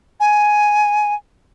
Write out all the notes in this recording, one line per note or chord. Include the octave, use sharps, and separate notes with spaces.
G#5